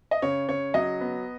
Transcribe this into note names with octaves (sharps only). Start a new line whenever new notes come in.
D#5
C#3 C#5
C#3 C#5
F#3 D#5
B3